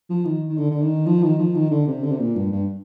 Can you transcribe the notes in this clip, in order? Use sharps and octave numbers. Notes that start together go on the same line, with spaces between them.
F3
D#3
D#3
D3
D3
D#3
F3
D#3
F3
D#3
D3
C3
D3
C3
A#2
G2
G2